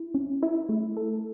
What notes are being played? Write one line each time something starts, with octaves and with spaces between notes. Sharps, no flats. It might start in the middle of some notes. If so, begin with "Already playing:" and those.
Already playing: E4
C#4
E4
A3
A4